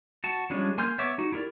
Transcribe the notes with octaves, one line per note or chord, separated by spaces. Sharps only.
F#4 A5
F3 G3 G#3 C#4 D4
A#3 G#5 C6 F6 G6
B3 C#5 E5 C#6 D6
D#4 F#4
E4 G4 A#4 D5